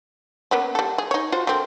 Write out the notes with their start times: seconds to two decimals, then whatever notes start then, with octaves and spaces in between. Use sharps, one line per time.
0.51 A#3 B3 C#4
0.75 G3 A4
0.98 G#4
1.11 D#4 C#5
1.32 F4 F#4 C5
1.47 D3 A#3 C4